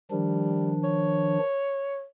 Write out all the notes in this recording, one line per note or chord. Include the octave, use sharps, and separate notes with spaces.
D#3 F3 G3 D4
C#5